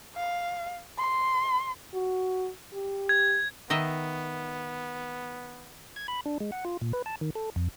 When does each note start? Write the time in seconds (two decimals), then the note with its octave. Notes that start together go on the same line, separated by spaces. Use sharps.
0.16 F5
0.98 C6
1.94 F#4
2.74 G4
3.09 G#6
3.70 D#3 B3 D#5 E5
5.96 G#6
6.08 B5
6.26 D4
6.40 G#3
6.52 F#5
6.65 F4
6.82 A#2
6.93 B4
7.06 A5
7.21 D#3
7.35 A4
7.56 F2